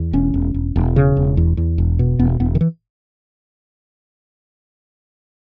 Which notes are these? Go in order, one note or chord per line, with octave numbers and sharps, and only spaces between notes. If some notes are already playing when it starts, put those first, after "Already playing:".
Already playing: E2
E1 C#4
E1
E1
E1
C#3
E1
E2
E2
E1
B2
E1 B3
E1 B3
D#3
E3